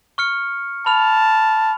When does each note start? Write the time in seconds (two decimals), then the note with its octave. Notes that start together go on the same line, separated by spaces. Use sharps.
0.18 C#6 F6 C#7
0.86 A5 B5 F6 F7